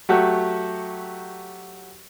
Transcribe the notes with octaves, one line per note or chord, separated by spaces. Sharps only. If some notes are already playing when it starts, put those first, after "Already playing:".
F#3 A3 F#4 G4